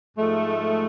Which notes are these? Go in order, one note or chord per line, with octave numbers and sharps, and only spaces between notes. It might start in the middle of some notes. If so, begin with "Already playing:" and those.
G#2 F3 G#3 A3